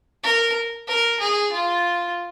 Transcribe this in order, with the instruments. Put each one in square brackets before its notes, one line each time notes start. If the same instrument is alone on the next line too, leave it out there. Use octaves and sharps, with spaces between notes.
[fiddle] A#4
A#4
G#4
F4